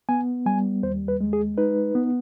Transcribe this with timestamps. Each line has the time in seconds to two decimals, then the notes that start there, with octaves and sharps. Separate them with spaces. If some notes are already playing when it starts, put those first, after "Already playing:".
0.09 B3 G#5
0.46 G3 G#5
0.83 D#2 C5
1.08 B4
1.21 G#3
1.33 G#4
1.58 D#4 B4
1.95 B3